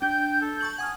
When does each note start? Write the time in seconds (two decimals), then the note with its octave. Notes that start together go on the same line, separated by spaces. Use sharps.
0.02 D4 G5 G6
0.42 A4
0.61 A5 C#6 F#7
0.78 F#5 G#5 D#6 F6